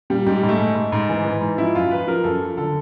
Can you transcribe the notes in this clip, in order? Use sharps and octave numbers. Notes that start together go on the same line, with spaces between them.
A#2 G3
G#2 G3
G#2
A3
G#2
G#2
G#2
E3
E3
G#2
F3 E4
F#2 F4
F3 B4
F3 A#4
F#2 A4
F3
D3 A4